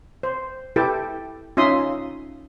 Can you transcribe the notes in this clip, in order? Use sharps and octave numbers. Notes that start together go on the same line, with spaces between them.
C5
E4 G4 A4 B4 G5 A5
C#4 D#4 F4 E5 C6 D#6